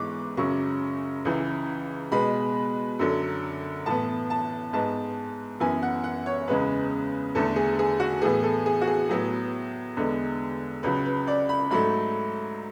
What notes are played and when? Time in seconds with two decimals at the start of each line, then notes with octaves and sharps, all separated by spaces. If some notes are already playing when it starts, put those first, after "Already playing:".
Already playing: G#2 E3 G#3 B3 C#6 D6
0.37 F#2 C#3 F#3 C#6
1.25 C#2 C#3 E3
2.12 B2 G#3 B3 B5
2.99 F#2 D3 F#3
3.86 A2 E3 B3 A5
4.30 A5
4.73 G#2 G#3 B3 A5
5.60 F#2 E3 B3 G#5
5.82 F#5
6.04 F#5
6.26 C#5
6.48 E2 C#3 G#3 B3 B4
7.35 E2 D3 A3 A4
7.56 G#4
7.79 G#4
8.00 F#4
8.22 A2 E3 B3 G#4
8.43 A4
8.66 G#4
8.81 F#4
8.87 G#4
9.09 A2 F#3 B3
9.96 E2 D3 G#3 B3
10.83 C#2 C#3 F#3 B4
11.05 B4
11.27 D5
11.49 B5
11.71 G#2 F#3 A3 B5